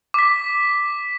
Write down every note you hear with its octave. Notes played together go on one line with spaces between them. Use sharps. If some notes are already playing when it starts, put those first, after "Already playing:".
D6 B6